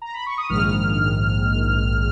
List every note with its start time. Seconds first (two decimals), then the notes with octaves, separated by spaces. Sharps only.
0.02 A#5
0.14 B5
0.26 C#6
0.38 D#6
0.49 A#1 G#2 D#3 F6